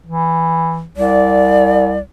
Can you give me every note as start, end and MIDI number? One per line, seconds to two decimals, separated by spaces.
0.06 0.85 52
0.97 2.00 36
0.97 1.99 74